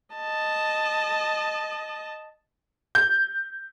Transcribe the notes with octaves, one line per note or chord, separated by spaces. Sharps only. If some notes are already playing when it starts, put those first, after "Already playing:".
D#5 A5
G6